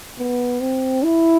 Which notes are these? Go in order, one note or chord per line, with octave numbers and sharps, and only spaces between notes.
B3
C4
E4